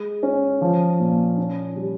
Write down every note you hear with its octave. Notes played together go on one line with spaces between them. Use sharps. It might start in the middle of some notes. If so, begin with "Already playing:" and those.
Already playing: G#3
C#4
F3
A#2
C#4
G3